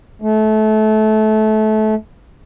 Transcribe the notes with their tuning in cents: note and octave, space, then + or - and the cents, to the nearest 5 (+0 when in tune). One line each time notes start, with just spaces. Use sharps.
A3 -25